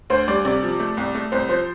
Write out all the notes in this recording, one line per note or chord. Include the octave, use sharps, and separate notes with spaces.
D2 C5
G3 D5
C3 D5
F3
A3
C2
A3
C2 C5
F3 C5